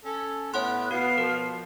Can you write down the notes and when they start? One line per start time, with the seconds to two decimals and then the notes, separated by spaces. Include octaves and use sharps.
0.05 C#4 A4
0.54 A2 B3 C#5 F#5 C6 F#6
0.91 B2 F#4 F5
1.18 F3 A#4